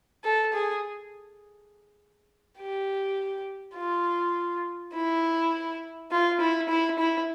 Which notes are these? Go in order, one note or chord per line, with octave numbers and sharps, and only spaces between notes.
A4
G#4
G4
F4
E4
F4
E4
E4
E4